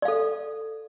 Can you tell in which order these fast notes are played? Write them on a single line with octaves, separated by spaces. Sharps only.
D5 F5 A4